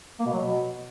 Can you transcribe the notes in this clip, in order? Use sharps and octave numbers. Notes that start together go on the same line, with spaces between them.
A#3
B2
F#3
B2